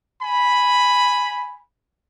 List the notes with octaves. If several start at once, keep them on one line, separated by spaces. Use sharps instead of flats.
G#5 B5